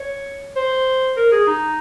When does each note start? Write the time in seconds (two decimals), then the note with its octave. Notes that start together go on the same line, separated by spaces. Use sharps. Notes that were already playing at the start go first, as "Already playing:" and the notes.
Already playing: C#5
0.56 C5
1.16 A#4
1.32 G#4
1.47 D#4